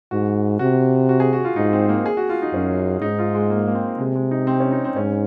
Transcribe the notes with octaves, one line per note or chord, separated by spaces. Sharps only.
G#2 F#4
C3 F#4
F#4
G#4
F#4
F4
G#2 D#4
C4
A#3
G#4
F#4
F4
D#4
F#2 C#4
G#2 D#4
F4
G#3
A#3
A#3
C4
C3 G#3
G#3
D#4
C4
C#4
D#4
C4
G#2 C#4